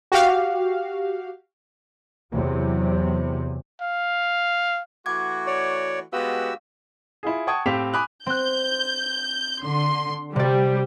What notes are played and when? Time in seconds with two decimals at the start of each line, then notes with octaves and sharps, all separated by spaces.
0.12 F#4 G4 F5
2.32 E2 C3 F#3
3.82 F5
5.06 E3 A3 F#4 F#5 D6 G#6
5.47 C#5 D5
6.13 G#3 B3 F#4 G4 F5 E6
7.23 E4 F4 G#4
7.47 F#5 G5 A5 C#6 D#6 G#6
7.66 A2 C4 G4 F5 B6 F7
7.94 G#5 B5 D6 D#6 F#6
8.26 C4 F#6 G6
9.64 D3 C6
10.36 C3 G3 D5